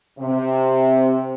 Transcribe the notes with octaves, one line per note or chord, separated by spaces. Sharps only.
C3